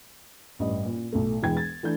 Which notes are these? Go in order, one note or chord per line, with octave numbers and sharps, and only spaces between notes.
A1 G2 D#5
A#2
B1 A2 A3
E1 E3 G#3 G5 G#6
A6
E3 A3 D4 G6